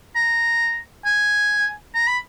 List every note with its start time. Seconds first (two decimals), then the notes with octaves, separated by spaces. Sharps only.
0.15 A#5
1.05 G#5
1.94 A#5
2.07 B5